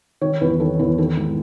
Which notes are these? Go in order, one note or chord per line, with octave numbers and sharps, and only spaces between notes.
D#3 C#5
E2 B4
D#3 A4
E2 B4
D#3 A4
G#2